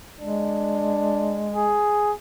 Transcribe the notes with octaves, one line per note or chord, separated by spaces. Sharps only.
G#3 D4
G#4